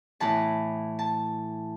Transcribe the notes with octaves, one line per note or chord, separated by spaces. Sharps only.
A2 E3 A5
A5